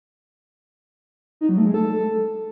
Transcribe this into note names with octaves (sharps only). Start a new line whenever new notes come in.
D#4
F#3
A3
G#3
A4